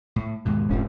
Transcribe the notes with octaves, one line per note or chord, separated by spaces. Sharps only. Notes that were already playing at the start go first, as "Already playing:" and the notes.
A2
D#2 G#2 B2
F1 G#2 C#4